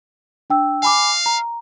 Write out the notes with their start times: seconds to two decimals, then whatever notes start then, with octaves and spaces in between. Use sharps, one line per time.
0.50 D4 G5 E6
0.83 F5 G#5 B5 D6
1.26 A#5